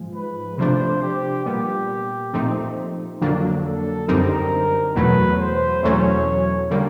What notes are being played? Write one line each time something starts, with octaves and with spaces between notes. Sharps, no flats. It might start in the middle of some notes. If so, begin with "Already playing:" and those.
Already playing: G#2 F3 G#3
B4
C3 F3 A3 D4 C5
G4
A#2 G3 B3 G4
A#2 F3 A3 C4 D#4
F2 D3 F#3 A#3 D4
A4
F#2 D3 G3 C4 D#4 A#4
E2 B2 F#3 A3 B4
C5
E2 B2 F#3 A3 C#4 C#5
D3 G3 A#3